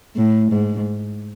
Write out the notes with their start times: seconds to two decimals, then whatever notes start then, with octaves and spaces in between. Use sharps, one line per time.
0.16 A2
0.52 G#2